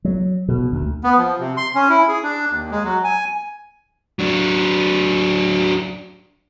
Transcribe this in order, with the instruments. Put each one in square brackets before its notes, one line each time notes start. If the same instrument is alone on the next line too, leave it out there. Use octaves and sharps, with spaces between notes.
[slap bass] F#3
B2
D2
[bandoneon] B3
F3
C3
C6
C#4
E4
G#4
D4
D#2
G#3
F#3
G#5
[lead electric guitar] F#3 D4